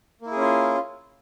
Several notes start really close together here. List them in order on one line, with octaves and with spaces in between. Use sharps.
A#3 E4 G#4 C#4 F4